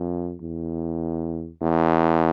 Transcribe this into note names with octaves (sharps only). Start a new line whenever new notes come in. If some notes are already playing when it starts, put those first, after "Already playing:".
Already playing: F2
E2
E2